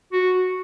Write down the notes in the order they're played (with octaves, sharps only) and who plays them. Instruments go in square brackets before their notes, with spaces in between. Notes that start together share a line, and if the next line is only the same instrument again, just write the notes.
[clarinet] F#4